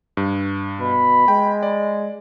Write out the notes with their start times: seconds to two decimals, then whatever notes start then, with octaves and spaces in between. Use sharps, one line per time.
0.17 G2
0.80 B2 B5
1.28 G#3 G5
1.63 D5